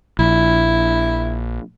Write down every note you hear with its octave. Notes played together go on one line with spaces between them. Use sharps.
A#1 E4